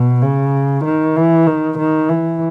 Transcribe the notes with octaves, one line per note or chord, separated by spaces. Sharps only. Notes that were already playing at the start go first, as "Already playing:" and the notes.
Already playing: B2
C#3
D#3
E3
D#3
D#3
E3